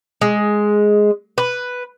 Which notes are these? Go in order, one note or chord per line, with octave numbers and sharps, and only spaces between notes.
G#3
B4